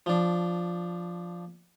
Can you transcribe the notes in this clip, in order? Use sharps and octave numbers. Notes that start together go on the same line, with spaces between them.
F3 D4